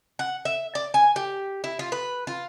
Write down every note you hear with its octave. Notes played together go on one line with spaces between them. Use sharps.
F#5
E5
D5
G#5
G4
E4
F4
B4
F4